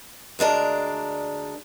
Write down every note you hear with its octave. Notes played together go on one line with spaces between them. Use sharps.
D2 G#3 D4 A#4